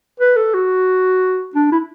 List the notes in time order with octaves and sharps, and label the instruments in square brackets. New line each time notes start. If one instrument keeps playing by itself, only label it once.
[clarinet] B4
A4
F#4
D4
E4